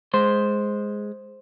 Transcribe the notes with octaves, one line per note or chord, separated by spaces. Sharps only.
G#3 C5